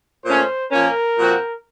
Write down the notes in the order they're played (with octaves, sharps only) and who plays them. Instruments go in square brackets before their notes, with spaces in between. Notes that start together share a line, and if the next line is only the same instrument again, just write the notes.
[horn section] A#2 A3 C#4 [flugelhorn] C5
[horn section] A#2 F3 A#3 C#4 [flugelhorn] A#4
[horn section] A#2 F3 C4 F#4